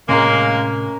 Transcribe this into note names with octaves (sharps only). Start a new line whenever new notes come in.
A2 C3 G#3 A#3 C#4 A#4